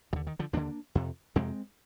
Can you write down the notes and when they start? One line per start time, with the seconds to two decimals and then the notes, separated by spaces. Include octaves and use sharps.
0.13 D#2 D#3
0.16 D3
0.27 D#3
0.39 D3 F3
0.53 D#2 D3 A#3 D4
0.95 F2 C3
1.36 F2 C3 G#3 C4